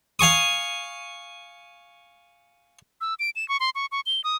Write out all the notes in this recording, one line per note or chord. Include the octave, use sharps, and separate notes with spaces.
F5 G#5 C#6 D#6
E6
D7
E7
C#6
C6
C#6
C#6
G7
D#6